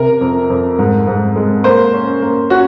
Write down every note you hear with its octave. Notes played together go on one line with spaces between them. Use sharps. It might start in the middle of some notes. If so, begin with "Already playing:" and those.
Already playing: C3 A#4
F2
F2
G#2
G#2
G#3
A#3 C5
C#4
A#3
C#4 F#4